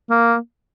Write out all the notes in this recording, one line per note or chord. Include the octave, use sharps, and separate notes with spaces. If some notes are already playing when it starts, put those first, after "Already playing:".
A#3